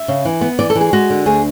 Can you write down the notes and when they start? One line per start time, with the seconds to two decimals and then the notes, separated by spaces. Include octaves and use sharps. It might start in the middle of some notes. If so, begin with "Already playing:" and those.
Already playing: E5
0.08 C#3
0.25 E3
0.41 B3
0.59 E3 D5
0.70 A4
0.75 E3
0.81 G#4
0.93 G#3 F#4
1.10 D3
1.26 D2 G#4